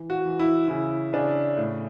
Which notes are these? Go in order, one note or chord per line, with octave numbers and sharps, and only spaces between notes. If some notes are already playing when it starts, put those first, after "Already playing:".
Already playing: E3
F#4
E3
E4
C#3 E4
C#3 D4
A2